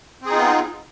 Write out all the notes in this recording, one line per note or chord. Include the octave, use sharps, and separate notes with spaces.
B3 C4 D#4 F4 G#4